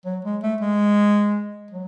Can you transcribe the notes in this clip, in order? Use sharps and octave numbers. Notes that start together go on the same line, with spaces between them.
F#3
G#3
A3
G#3
F#3